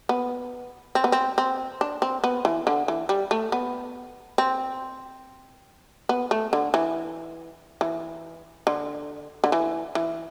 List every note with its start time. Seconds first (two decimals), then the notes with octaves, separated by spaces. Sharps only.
0.09 B3
0.95 C4
1.04 B3
1.12 C4
1.38 C4
1.81 D4
2.02 C4
2.24 B3
2.45 E3
2.67 D3
2.88 E3
3.09 G3
3.31 A3
3.52 B3
4.38 C4
6.09 B3
6.31 A3
6.53 D3
6.74 E3
7.81 E3
8.67 D3
9.44 D3
9.52 E3
9.95 E3